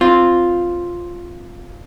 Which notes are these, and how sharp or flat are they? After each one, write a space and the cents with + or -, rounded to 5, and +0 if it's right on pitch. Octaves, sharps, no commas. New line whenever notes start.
C4 +0 F4 +0